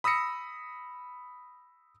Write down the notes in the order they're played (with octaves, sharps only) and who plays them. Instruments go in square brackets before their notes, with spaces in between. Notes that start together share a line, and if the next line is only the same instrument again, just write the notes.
[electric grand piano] B5 D#6 E6 A#6 C#7